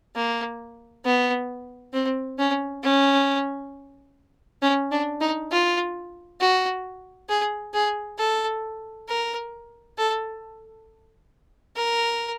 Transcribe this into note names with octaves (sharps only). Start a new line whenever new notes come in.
A#3
B3
C4
C#4
C#4
C#4
D4
D#4
F4
F#4
G#4
G#4
A4
A#4
A4
A#4